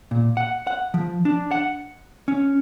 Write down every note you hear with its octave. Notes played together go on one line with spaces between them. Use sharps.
A#2
F#5
F#5
F3
D4
F#5
C#4